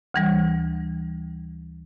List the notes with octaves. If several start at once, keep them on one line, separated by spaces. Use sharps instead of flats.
D2 E3 G3